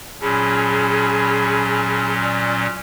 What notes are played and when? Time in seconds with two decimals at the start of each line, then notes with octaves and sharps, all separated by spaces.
0.21 A#2 F#3 C#4 G#4 A5 B5
2.24 D5